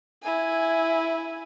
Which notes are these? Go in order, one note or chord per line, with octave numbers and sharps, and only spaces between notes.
E4 G#5